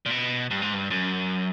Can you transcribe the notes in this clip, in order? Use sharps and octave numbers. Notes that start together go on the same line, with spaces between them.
A#2
B2
G2
G#2
G2
F#2